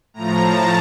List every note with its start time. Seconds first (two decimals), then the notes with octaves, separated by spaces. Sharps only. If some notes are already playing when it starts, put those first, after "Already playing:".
0.14 A2 F3 A#5
0.43 A5